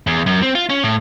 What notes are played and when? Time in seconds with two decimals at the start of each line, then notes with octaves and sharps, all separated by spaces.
0.07 E2
0.26 F#2
0.42 C4
0.55 F4
0.70 C#4
0.84 A2